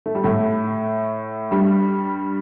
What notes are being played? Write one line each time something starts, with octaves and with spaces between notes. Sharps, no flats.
A3
G3
A2 A3
G2 G3